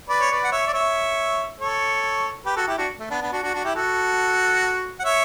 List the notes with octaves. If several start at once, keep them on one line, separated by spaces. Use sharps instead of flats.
B4 D5
C#5
B4 D5
F#5
C#5 E5
D5
C#5 E5
A4 C#5
G4 B4
F#4 A4
E4 G4
D4 F#4
A3
B3 D4
B3 D4
D4 F#4
D4 F#4
D4 F#4
E4 G4
F#4 A4
F#5
C#5 E5